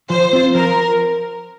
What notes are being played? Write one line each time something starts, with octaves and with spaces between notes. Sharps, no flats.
F3 C5
C4 F4
F3 A#4